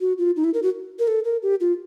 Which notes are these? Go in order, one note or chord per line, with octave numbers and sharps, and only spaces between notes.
F#4
F4
D#4
E4
A#4
F#4
A#4
A4
A#4
G4
F4